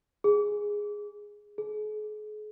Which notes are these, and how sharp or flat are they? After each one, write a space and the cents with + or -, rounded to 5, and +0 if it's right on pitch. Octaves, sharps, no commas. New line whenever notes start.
G#4 -5
G#4 +40